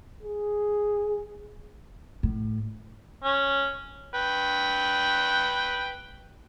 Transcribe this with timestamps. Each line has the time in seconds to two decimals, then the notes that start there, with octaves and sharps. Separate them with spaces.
0.23 G#4
2.23 A2
3.23 C#4
4.14 B4 G5